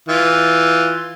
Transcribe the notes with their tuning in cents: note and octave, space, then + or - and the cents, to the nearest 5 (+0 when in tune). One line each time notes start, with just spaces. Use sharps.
E3 +0 F4 +0